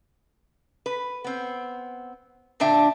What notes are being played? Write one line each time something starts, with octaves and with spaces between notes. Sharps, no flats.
B4
B3 C4
A#2 D3 D4 E5 G5